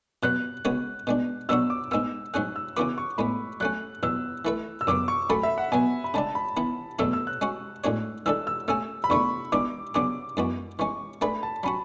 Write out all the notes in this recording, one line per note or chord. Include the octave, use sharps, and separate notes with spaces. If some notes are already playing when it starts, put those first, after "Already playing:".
B2 F#3 B3 F#6
C#3 G#3 B3 F#4 C#5
B2 G#3 D4
B2 F#3 B3 D4 F#4 E6
D6
G#2 G#3 B3 E6
G#2 F#3 C#4 G#4 F#6
E6
C#3 E3 B3 F#4 B4 D6
C#6
A2 G#3 B3 B5
F#3 A3 C#4 F#6
E2 B2 F#3 E6
E3 A3 E4 B4 E5
E6
F#2 C#3 F#3 B3 D6
C#6
F#3 A3 C#4 F#4 A4 B5
E5
F#5
B2 F#3 B3 G#5
B5
C#3 G#3 D4 A5
B5
E3 B3 E4 B5
E2 B2 F#3 A3 E4 E6
E6
F#6
G#3 C#4 F#4
A2 G#3 D4 F#4 C#5
E3 G#3 D4 A4 E6
E6
A3 C#4 G#4 E6
B5
E2 D3 A3 C#6
E3 G#3 B3 D4 D6
C#3 F#3 B3 D4 G#4 D6
F#2 E3 G#3 B3 F#4
E3 G#3 C#4 C#6
A3 D4 G#4 B4 E5 B5
A5
F#3 C#4 F#4 B5